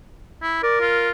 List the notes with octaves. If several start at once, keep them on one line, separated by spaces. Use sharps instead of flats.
E4
A#4 D5
F4